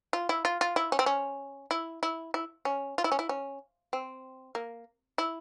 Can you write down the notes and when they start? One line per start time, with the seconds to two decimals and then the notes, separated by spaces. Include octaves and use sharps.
0.13 F4
0.29 E4
0.45 F4
0.61 F4
0.76 E4
0.92 C#4
0.99 C4
1.06 C#4
1.71 E4
2.03 E4
2.34 E4
2.65 C#4
2.98 F4
3.04 E4
3.12 C#4
3.19 E4
3.29 C#4
3.93 C4
4.55 A#3
5.18 E4